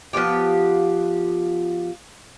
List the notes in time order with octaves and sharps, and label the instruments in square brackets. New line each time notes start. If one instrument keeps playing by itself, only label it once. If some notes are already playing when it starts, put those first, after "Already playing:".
[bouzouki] F3 B3 F4 G4